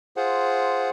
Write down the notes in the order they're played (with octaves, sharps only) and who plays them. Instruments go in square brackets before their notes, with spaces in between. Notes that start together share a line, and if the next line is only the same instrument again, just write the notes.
[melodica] F4 G#4 C5 F#5